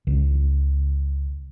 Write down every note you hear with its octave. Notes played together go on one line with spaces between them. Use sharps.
C#2